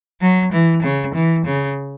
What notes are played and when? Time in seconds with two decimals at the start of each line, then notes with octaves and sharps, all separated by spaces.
0.21 F#3
0.52 E3
0.82 C#3
1.15 E3
1.45 C#3